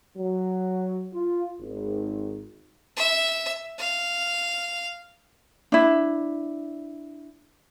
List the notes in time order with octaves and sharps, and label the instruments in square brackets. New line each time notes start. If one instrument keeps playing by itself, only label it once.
[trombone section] F#3
F4
G#1
[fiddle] E5
F5
[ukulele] D4 E4